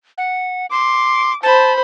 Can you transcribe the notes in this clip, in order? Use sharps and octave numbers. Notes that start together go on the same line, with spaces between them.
F#5
C6 D6
C5 A5 B5